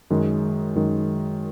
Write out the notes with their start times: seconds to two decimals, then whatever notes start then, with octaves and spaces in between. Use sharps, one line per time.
0.10 F#2 D#3 G#3
0.75 F#2 D#3 G#3